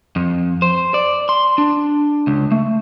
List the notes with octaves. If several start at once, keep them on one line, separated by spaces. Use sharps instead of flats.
F2
C5
D5
C6
D4
C#2
A3